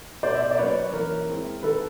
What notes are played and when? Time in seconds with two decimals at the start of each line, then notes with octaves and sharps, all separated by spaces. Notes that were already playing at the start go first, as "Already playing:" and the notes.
0.23 B2 C5 D5
0.35 E5
0.43 D#5
0.51 D5
0.58 F#3 A#3 C#4 B4 C#5
0.93 E3 A#4
1.28 G#3 C4 E4
1.63 D#3 A4 B4